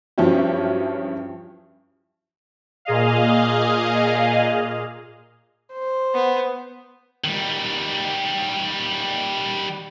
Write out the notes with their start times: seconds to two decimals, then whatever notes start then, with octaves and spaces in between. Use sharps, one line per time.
0.18 G2 F3 F#3 C#4 E4 G4
2.85 A#2 G#4 D#5 F5
5.73 C5
6.14 B3
7.24 D#3 G3